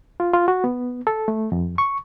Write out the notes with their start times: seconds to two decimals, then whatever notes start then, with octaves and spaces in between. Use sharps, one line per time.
0.20 F4
0.34 F4
0.48 F#4
0.64 B3
1.07 A4
1.28 A3
1.52 F2
1.78 C#6